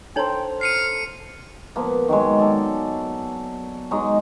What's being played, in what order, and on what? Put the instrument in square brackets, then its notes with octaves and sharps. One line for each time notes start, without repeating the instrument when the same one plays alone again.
[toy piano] D4 D#4 C#5 [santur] A4 A#4 C5 [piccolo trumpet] G5
[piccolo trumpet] F6 [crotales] C7 C#7 D#7
[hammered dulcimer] F3 A#3 B3
D#3 F#3 G#3
A4 D5
F#3 G#3 D#4 D#5